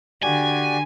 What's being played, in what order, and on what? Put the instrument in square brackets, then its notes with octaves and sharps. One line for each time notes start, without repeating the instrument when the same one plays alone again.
[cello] D3 [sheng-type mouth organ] F#4 G4 D5 [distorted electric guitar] G#5